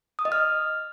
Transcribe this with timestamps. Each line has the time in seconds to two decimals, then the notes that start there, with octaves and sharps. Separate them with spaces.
0.19 D#6
0.25 D#5
0.32 F6